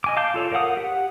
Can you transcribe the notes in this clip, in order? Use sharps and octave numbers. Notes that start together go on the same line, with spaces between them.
D#5 G#5 D6
F5 A5 D6 G6
F4 A4 C#5
A#4 C#5 F5 F#5 D#6
G4 F#5